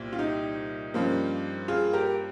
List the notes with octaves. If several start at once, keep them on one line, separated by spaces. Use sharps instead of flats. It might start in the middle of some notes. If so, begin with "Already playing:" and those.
Already playing: C2 A#2 G3
F4
D#4 G4
G2 F3 A#3 C#4
F4 G#4
G4 A#4